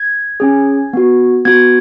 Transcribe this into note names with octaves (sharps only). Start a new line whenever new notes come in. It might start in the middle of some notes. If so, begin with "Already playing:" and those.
Already playing: G#6
C#4 G#4
B3 F#4
B3 F#4 G#6